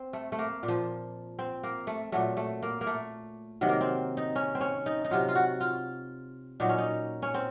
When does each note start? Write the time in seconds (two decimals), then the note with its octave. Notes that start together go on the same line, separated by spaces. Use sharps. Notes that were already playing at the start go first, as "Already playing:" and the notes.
Already playing: C4
0.13 A3
0.32 A3
0.39 A#3
0.63 A#2
0.68 F3
1.39 C4
1.63 A#3
1.87 A3
2.12 A#2 F#3 A3
2.37 A3
2.63 A#3
2.81 A#3
2.87 A3
3.61 C3 D#3 F#3
3.69 A#3
3.81 C4
4.17 D#4
4.35 C#4
4.55 C4
4.61 C#4
4.86 D#4
5.05 D#4
5.11 C3 F#3 F4
5.28 F4
5.35 F#4
5.60 F4
6.60 A#2 F#3 D#4
6.69 C#4
6.78 D#4
7.22 C#4
7.34 C4